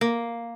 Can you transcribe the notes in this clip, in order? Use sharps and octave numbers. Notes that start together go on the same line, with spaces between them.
A#3